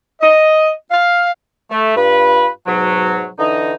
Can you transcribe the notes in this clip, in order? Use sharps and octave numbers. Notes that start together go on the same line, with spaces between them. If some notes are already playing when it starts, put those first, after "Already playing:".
D#5
F5
A3
G2 F4 B4
G#2 B2 F#3
D3 E3 D#4